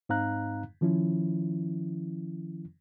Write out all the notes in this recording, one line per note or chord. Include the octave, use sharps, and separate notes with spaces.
G#2 C4 D#4 F5 A#5 F#6
D#3 F3 C#4 E4